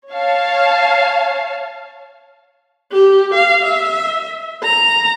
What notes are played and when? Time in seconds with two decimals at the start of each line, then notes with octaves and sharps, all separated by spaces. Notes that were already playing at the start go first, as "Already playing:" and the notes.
0.12 C#5 F5 A5
2.92 G4
3.34 F5
3.65 E5
4.63 A#5